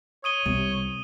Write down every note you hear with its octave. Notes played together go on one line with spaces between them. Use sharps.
C#5 D#6 D#7 G7
C2 C3 G3